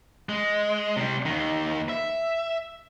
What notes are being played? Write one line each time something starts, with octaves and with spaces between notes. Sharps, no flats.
G#3
C3 G3
D#2 D#3
E5